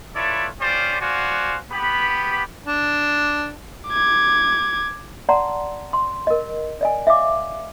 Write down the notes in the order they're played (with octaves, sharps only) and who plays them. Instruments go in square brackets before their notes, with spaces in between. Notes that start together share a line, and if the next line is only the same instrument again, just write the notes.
[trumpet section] E4 F4 A4 B4 C#5 D5
C#4 F4 G4 C5 D5
F#4 C5 D5 F5 F#5 G#5
B3 G4 B5
[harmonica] D4
[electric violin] D6 G#6
[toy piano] D5 F#5 A5 A#5 C6
C6
A#4 D#5
D5 D#5 G#5
E5 F5 D6